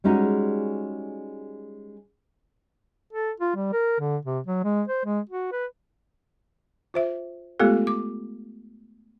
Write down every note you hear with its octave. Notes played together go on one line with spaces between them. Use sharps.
G3 G#3 C#4 D#4 F#4 G#4
A4
F4
G3
A#4
D3
C3
F#3
G#3
C5
G#3
F#4
B4
F4 C5 E5
G#3 A3 B3 F4 G4 A4
D6